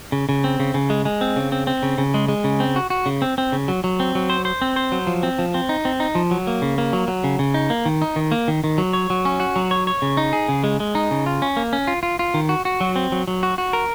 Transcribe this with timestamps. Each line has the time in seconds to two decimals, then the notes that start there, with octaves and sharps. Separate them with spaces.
0.12 C#3
0.29 C#3
0.44 C4
0.60 C#3
0.74 C#3
0.90 G#3
1.05 G#3
1.21 C4
1.36 C#3
1.52 C4
1.67 C4
1.83 C#3
1.98 C#3
2.14 G#3
2.28 G#3
2.44 C#3
2.60 C4
2.76 F#4
2.90 F#4
3.06 C#3
3.22 C4
3.38 C4
3.52 C#3
3.68 F#3
3.84 F#3
4.00 C4
4.15 F#3
4.30 C5
4.45 C5
4.62 C4
4.76 C5
4.92 F#3
5.07 F3
5.23 C4
5.39 F3
5.54 C4
5.69 D#4
5.85 C4
6.00 D#4
6.15 F3
6.31 F#3
6.47 A#3
6.62 C#3
6.78 A#3
6.93 F#3
7.08 F#3
7.24 C#3
7.39 C#3
7.54 D#4
7.70 A#3
7.86 D#3
8.02 D#4
8.16 D#3
8.32 A#3
8.48 D#3
8.64 D#3
8.78 F#3
8.93 C#5
9.10 F#3
9.25 C#4
9.40 F#4
9.56 F#3
9.71 C#5
9.87 C#5
10.02 C#3
10.17 D#4
10.33 G#4
10.48 C#3
10.64 G#3
10.80 G#3
10.95 D#4
11.11 C#3
11.26 F4
11.42 C#4
11.57 A#3
11.73 C#4
11.87 F4
12.03 F4
12.19 F4
12.34 D#3
12.49 F#4
12.65 F#4
12.81 F#3
12.96 C4
13.12 F#3
13.28 F#3
13.43 F#4
13.58 F#4
13.73 A#4